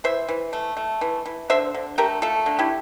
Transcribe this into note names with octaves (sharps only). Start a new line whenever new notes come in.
E3 C5 E5
E3
A3
A3
E3
E3
D3 C5 E5
D3
A3 G4 A#4
A3 F4 A4
D3
E4 G4